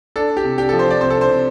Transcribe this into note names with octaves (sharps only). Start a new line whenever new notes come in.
D4 A4
D4
G4
C3
D4 G4
F3 A4
C5
F3 D5
C3 C5
A4
D4
C5
C3